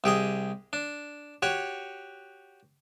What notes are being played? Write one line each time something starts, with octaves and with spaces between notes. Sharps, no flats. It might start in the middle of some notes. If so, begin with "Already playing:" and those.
C2 G4 G#4 D#5
D4
F#4 G4 C#5